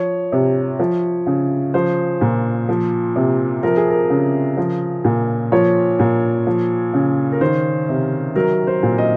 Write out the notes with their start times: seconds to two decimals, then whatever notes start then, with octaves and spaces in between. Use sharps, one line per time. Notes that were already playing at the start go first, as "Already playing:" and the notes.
Already playing: F3 C#5
0.32 C3
0.79 F3
1.26 C#3
1.74 F3 C5
2.21 A#2
2.69 F3
3.16 C3
3.63 F3 A#4
3.77 G#4
3.90 A#4
4.10 C#3
4.57 F3
5.05 A#2
5.52 F3 C#5
5.99 A#2
6.47 F3
6.94 C#3
7.32 A#4
7.41 D#3 C5
7.89 C3
8.36 F#3 A#4
8.67 C5
8.83 A#2
8.98 D#5